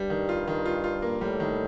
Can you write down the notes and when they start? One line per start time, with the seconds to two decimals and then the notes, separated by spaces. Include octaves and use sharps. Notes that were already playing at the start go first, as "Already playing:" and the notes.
Already playing: G2 G3
0.10 D#3
0.29 F4
0.47 D#3
0.66 F4
0.84 F4
1.02 A#3
1.21 A2 G3
1.40 D#3